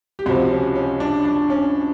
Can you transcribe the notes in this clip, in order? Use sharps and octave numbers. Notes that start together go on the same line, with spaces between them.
G4
C#2 C3 F3 F#4
C#4
C#4
D4
D4
C#4